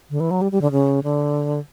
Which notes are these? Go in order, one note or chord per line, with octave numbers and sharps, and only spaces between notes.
D3
E3
F#3
G3
G3
D3
C#3
D3